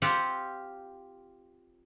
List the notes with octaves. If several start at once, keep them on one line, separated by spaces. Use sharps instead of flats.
C4 F4 G4 F5 F#5